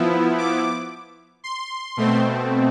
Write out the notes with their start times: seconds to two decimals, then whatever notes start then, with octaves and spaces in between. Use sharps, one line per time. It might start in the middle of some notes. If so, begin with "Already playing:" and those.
Already playing: F3 B3 E4
0.38 D6
1.44 C6
1.97 B2 A3 C4